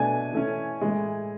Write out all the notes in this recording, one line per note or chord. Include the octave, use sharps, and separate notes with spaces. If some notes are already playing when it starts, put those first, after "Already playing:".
Already playing: B2 A3 D4 G#5
E3 A3 C#4
A2 E3 G#3